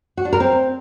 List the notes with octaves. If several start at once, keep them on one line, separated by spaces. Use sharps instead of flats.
F#4
D4
A#4
C4